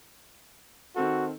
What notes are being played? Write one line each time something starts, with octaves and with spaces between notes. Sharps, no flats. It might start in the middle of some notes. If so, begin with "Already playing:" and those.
D#3 C4 F#4 A4